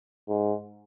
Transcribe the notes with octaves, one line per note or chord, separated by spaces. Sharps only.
G#2